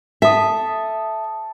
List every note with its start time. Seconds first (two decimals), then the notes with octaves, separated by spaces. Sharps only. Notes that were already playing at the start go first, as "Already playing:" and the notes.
0.22 A4 E5 D#6